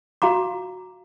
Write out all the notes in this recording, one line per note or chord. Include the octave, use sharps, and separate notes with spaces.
F#4 F5 A#5 D6